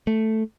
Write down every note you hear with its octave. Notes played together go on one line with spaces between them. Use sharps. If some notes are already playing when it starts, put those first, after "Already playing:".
A3